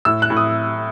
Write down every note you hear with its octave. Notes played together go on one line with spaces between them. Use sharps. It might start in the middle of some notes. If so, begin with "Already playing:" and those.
A2 E6
F#6
A2
D#6